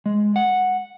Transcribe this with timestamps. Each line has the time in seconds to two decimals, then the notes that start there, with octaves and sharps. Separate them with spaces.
0.06 G#3
0.36 F#5